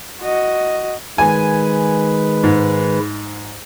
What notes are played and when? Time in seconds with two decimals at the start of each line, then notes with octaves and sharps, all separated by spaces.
0.21 F#4 D#5
1.18 D#3 G#3 B4 G#5
2.43 G#2